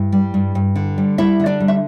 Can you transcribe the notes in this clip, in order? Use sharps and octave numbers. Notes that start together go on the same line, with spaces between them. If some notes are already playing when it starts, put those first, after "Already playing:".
Already playing: G2 E4
G3
G2
G2
D3
G3
G3 E4 E5
D3
D4 D5
G3
E5